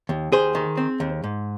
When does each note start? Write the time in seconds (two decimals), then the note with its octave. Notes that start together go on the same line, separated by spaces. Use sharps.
0.09 D#2
0.32 D#2 G#4 C5
0.55 D#3
0.77 C4
1.00 D#2
1.24 G#2